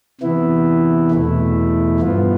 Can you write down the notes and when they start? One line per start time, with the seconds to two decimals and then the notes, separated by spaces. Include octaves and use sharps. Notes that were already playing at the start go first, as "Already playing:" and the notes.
0.21 C3 E3 B3 E4
1.12 E2 B2 A3 E4
2.00 G2 F3 B3 F4